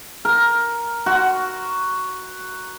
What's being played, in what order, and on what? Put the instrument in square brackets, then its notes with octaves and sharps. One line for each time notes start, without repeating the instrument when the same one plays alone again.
[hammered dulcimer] A#4
F#4